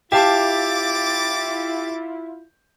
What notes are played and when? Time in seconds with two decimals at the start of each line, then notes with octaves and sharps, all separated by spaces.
0.12 E4 F4 G4 E5 F5 A5 D6 A6